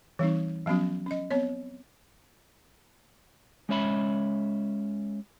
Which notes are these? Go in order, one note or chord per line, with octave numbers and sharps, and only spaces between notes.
E3 G3 C4 D#4
F3 F#3 B3 C#4 F#4
C#4 D#5
B3 C4 C#5
G#3 C#4 C#5 E5 B5